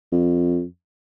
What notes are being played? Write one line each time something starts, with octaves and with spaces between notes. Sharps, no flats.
F2